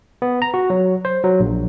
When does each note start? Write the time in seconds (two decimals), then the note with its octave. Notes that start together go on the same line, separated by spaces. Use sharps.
0.22 B3
0.42 A#5
0.54 F#4
0.70 F#3
1.05 C5
1.24 F#3
1.40 A#1